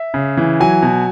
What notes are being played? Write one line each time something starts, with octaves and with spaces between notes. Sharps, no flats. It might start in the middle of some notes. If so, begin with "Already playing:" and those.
Already playing: E5
C#3
E3
F#3 G#5
B2